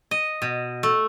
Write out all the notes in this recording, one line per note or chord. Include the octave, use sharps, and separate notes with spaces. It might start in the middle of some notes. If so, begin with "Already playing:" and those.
D#5
B2
A3